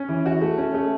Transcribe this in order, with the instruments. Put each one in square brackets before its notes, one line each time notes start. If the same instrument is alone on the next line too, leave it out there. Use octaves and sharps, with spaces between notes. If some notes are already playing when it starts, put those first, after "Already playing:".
Already playing: [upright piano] C#4
E3
F#4
A3
C#4
A3